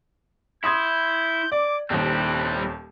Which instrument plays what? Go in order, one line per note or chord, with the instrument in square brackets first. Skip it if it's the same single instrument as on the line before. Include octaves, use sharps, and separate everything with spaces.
[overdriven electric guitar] E4 [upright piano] C6 D#6 G#6 [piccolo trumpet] G6
[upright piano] D5 [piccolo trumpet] D6
[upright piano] D#1 D#2 [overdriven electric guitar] G3 C4 [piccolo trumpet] F#6